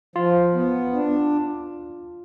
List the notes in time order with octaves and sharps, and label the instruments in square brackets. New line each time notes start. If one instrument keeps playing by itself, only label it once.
[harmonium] F3 [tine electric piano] F4
[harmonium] B3
D4